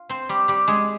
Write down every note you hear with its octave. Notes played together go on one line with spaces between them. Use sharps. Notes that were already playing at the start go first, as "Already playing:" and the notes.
Already playing: F4
C4 C5
G3 G4
G3 G4
G#3 G#4